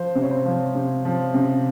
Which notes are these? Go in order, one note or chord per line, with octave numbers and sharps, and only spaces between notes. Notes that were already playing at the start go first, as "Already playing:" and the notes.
Already playing: F3 C5
C3
C#5
C5
F3
C3
F3
C3